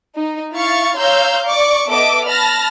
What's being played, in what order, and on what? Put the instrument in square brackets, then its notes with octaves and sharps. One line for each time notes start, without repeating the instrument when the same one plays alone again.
[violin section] D#4
E4 F5 C#6 A6
C#5 F5 A#5 C6 E6 G6
D5 C#6 D6
B3 A4 D#5 E5 D6 D7
A5 B5 F6 A6 A#6